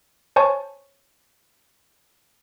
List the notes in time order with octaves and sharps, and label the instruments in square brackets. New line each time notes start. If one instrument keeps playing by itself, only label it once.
[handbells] C5 C#5 G#5 A5 C#6